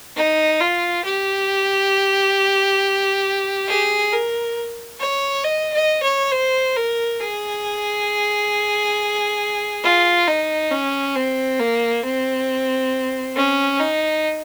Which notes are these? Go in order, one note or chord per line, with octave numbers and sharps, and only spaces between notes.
D#4
F4
G4
G#4
A#4
C#5
D#5
D#5
C#5
C5
A#4
G#4
F4
D#4
C#4
C4
A#3
C4
C#4
D#4